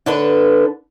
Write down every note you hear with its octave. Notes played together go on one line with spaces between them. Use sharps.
D3 D4 A4 B4